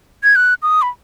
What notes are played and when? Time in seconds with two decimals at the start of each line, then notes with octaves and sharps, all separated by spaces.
0.24 G#6
0.36 F#6
0.63 D#6
0.82 B5